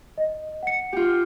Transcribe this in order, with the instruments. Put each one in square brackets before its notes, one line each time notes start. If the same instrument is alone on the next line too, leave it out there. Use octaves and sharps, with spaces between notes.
[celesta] D#5
F#5 C#7
[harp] F4 G4